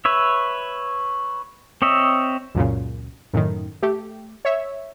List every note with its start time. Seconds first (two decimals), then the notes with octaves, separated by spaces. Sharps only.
0.05 B4 C#5 E5
1.82 C4 C#5 D#5 E5
2.55 C#2 F#2 A#2 C#3
3.33 F#2 A2 D#3
3.82 A3 G4
4.45 C#5 E5